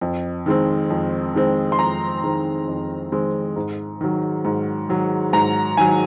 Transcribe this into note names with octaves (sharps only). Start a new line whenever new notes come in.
F2
D#3 G#3 C4
F2
D#3 G#3 C4
C6
F2 A#5
D#3 G#3 C4
F2
D#3 G#3 C4
G#2
D#3 F#3
G#2
D#3 F#3
G#2 A#5
D#3 F#3 G#5